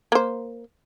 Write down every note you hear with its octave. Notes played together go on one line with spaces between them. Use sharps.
A#3 C5